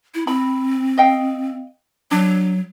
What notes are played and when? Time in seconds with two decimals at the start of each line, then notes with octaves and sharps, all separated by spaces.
0.15 E4
0.27 C4 B5
0.98 D#5 F5 G5
2.11 F#3 D4